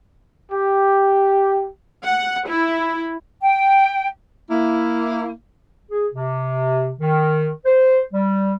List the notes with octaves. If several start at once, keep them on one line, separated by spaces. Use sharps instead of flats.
G4
F#5
E4
G5
A#3 E4
G#4
C3
D#3
C5
G3